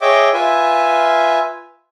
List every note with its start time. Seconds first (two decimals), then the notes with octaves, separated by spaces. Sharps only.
0.01 G#4 C#5 D#5 E5 G5 D6
0.33 F4 B4 E5 G#5